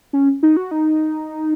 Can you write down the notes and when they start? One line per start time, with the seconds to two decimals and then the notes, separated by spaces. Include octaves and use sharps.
0.13 C#4
0.43 D#4
0.57 F#4
0.71 D#4